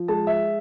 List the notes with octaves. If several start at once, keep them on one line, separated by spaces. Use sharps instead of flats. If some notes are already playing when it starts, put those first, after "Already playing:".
Already playing: F3
G#3 A5
E5